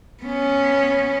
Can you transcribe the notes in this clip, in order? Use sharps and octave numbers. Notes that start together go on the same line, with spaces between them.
B3 C#4